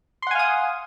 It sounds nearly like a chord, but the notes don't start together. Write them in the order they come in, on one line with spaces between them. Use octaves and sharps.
C6 F#5 G#5 F5 D#6